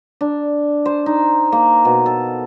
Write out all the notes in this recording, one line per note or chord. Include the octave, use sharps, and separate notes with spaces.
D4
C5
D#4
A#3
B2
A4